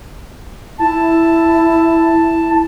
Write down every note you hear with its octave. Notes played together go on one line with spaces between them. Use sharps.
E4 A5